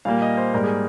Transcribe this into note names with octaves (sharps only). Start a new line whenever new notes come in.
A#2 G3 A#3 F5
D#5
C5
G#2 G3 A#3 A#4
G#4